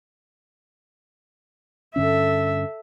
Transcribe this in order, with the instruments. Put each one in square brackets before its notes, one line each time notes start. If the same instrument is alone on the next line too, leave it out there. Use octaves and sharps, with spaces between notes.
[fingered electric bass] G2 D3 C#4 [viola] A4 E5